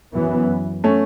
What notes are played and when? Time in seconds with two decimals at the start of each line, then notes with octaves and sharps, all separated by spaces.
0.14 F#2 E3 B3
0.84 A3 C#4